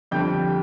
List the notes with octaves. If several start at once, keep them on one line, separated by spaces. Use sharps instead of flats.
F2 D3 G3 G5 G6